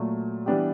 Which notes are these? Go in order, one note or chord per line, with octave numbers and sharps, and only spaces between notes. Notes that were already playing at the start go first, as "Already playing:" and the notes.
Already playing: A#2 F#3 A3
E3 G3 B3 D4 G4